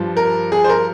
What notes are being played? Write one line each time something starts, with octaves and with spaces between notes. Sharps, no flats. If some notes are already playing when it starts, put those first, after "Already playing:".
Already playing: G2 F3
A#4
G#4
C5
A#4